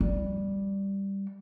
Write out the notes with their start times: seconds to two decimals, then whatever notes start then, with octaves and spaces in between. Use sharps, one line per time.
0.01 G3